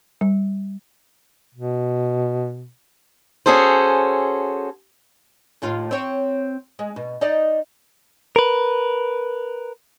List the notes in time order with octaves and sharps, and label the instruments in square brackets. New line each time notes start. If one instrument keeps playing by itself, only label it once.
[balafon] G3
[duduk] B2
[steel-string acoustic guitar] C#4 F#4 G#4 A4 C5
[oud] D#2 A2 F4
C4 C#5
G#3
B2
D#4 D5 D#5
[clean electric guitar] A#4 B4